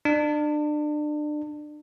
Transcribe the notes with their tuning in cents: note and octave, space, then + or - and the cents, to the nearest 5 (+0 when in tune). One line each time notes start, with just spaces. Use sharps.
D4 +30